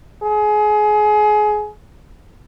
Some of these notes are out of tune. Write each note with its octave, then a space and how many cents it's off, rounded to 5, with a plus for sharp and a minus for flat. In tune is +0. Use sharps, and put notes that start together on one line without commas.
G#4 +25